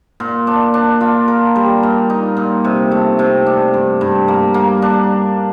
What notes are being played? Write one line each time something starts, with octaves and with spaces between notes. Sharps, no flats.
A#2
D4
D4
F4
A#4
G3
A#2
D#4
A#2
C3
A3
C3
D4
G2
G2
A#3
A#3
D4